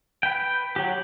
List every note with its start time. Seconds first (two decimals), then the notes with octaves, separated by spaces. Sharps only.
0.23 B4 G5
0.76 F#3 G4